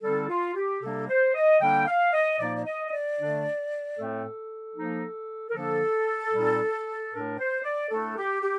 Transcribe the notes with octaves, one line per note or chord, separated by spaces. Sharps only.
D3 G3 C4 D#4 A4
F4
G4
C3 G3 A#3 D4 A4
C5
D#5
D3 G3 A#3 D4 G5
F5
D#5
A#2 F3 A#3 D#4 D5
D5
D#5
D#5
D5
D3 A3 D4
A2 A3 C4 A4
F3 A#3 D#4
A#4
D3 F3 A#3 D4 A4
A#2 G3 C4 D#4
A2 A3 D4 A#4
C5
D5
A2 A3 D4 A4
G4
G4